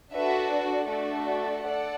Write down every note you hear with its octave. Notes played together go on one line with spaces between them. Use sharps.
D4 F#4 A4 B4 E5
D5
A3 D4 F#4 A4 D5
D5
A4 D5 F#5